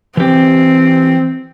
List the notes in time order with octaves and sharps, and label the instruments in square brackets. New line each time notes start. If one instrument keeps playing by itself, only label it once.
[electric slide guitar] E3 G4 [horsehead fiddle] C4